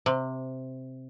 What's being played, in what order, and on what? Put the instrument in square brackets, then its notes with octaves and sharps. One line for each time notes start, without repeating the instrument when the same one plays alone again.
[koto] C3